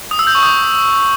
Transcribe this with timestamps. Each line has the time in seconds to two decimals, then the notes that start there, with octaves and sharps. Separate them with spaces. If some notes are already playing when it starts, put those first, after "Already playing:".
0.11 D#6
0.19 E6
0.27 G6
0.35 C#6
0.43 D#6